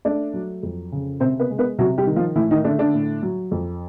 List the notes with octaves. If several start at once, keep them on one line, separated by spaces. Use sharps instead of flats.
A3 D4 D5
F#3
F2
C#3
C3 C4 C5
B3 B4
G#3
B3 B4
C3 F#3 F#4
G3 G4
D#3
F3 F4
A2 E3 E4
D#3 D#4
D3 A3 D4
D3 D4
A2
F#3
F2